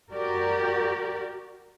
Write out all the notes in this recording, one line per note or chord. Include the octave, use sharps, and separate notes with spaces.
F#4 G4 A#4 D5